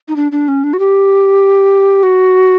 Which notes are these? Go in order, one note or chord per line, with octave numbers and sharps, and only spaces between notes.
D#4
D4
D4
C#4
D4
F#4
G4
F#4